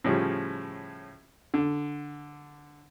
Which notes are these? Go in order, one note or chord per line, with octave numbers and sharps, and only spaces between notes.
A2 C#3 F3 G3
D3